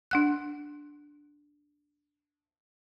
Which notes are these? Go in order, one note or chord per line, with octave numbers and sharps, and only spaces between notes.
D4 F#5 F#6